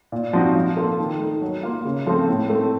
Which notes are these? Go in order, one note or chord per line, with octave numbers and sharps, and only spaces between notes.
A#2
F3 C4 D#4 F#4
F3
A#3 F4 A4
D#3
A3 D#4
F#3
A#3 F4
C#3
F3 A3 C4 F4
A2
A3 C4